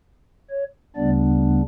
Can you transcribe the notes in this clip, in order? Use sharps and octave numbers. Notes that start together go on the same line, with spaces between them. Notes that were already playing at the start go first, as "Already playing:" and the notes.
C#5
D2 C#3 G3 B3 D4 D5